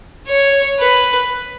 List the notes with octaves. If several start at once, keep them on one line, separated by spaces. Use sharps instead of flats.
C#5
B4